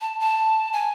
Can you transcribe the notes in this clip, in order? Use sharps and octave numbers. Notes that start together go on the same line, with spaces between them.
A5
A5
G#5